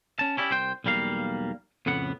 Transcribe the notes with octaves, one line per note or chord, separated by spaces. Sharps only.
C#4 A5
C#4 E4 G4 D5
C2 C5 G5
B1 E2 G3 A#3 F5
F2 A2 C#3 B3 F#5